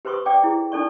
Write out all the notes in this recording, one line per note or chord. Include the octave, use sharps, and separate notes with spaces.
G4 B4 C5 C6 C#6 D#6
D5 G5 D6 D#6
E4 G#4
D4 D#4 A4 D5 C#6